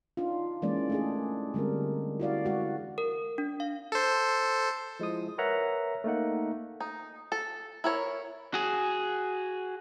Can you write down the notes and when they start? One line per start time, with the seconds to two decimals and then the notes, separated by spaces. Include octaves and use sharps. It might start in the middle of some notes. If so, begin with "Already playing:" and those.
0.17 D4 D#4 F4
0.62 E3 G#3 A#3 C#4 D5
0.90 A3 D4 G#4
1.54 D3 G3 G#3 C4 A#4
2.20 E4 F#4 D5 F5
2.45 G#3 F#4 D5
2.98 A#4
3.38 D4
3.60 F5
3.92 A4 C5
5.00 F3 G#3 E4 D#6
5.38 A#4 B4 C#5 E5 F#5 A#5
6.04 A3 A#3 D#4 F#5
6.80 D#4
7.32 A4
7.84 E4 A#4 C#5
8.54 F#4 G#4